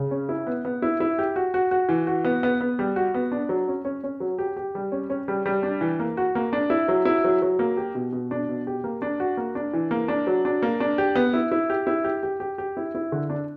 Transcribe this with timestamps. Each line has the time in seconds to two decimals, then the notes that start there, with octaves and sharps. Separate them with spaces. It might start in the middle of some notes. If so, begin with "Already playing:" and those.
Already playing: C#3
0.11 C#4
0.29 E4
0.47 B3
0.65 B3
0.82 E4
1.00 E4
1.19 G4
1.36 F#4
1.54 F#4
1.71 F#4
1.89 E3
2.07 F#4
2.25 B3
2.43 B3
2.61 B3
2.79 G3
2.96 F#4
3.14 B3
3.32 D4
3.49 F#3
3.68 C#4
3.85 C#4
4.04 C#4
4.20 F#3
4.39 G4
4.57 G4
4.75 G3
4.92 C#4
5.10 C#4
5.28 G3
5.46 G3
5.63 D4
5.81 E3
5.99 A#3
6.17 F#4
6.35 A#3
6.53 D4
6.70 E4
6.88 F#3
7.05 E4
7.24 F#3
7.42 F#3
7.59 A#3
7.77 G4
7.95 B2
8.13 B2
8.31 D4
8.49 B2
8.67 G4
8.84 A#3
9.02 D4
9.20 F#4
9.37 A#3
9.55 D4
9.74 E3
9.91 A#3
10.08 D4
10.27 F#3
10.45 D4
10.62 A#3
10.80 D4
10.98 G4
11.15 B3
11.34 E4
11.52 E4
11.70 G4
11.87 E4
12.04 G4
12.23 G4
12.40 G4
12.58 G4
12.77 E4
12.95 E4
13.12 D3
13.30 D4